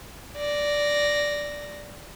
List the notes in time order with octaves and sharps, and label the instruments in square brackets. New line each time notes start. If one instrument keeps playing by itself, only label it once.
[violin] D5 A#6